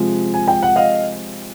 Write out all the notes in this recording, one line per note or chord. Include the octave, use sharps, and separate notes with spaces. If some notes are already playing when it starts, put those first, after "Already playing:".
Already playing: C3 F3 G#3
G#5
G5
F#5
D#5 F5